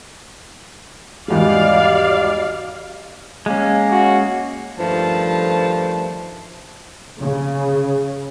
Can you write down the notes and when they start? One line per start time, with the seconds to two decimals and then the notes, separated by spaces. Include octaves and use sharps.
1.28 G#1 E2 G3 F#4 G4 D5 D#5 F5
3.46 G#3 A#3 C#4
3.92 F#4
4.78 G2 D#3 F3 A3 A5
7.19 C#3